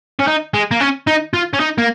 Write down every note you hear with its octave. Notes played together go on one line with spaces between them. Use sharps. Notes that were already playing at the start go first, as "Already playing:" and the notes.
C#4
D#4
G#3
A#3
C#4
D#4
F4
C#4
D#4
A#3